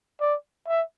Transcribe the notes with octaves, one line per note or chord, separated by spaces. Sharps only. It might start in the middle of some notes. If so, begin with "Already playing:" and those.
D5
E5